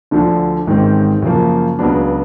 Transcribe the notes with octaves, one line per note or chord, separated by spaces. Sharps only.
D2 D3 F3
A1 G#2 D#3 G#3 C4
F#2 C#3 F3 A#3
C#2 C#3 F#3 B3 D4